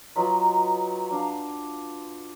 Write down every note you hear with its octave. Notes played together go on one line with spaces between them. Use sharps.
F#3 D#4 F4 B4
D4 F5